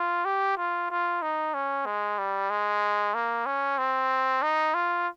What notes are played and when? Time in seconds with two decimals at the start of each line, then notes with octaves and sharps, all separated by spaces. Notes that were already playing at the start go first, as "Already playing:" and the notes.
Already playing: F4
0.25 G4
0.57 F4
0.90 F4
1.22 D#4
1.54 C#4
1.85 G#3
2.18 G3
2.50 G#3
3.15 A#3
3.46 C#4
3.78 C4
4.42 D#4
4.74 F4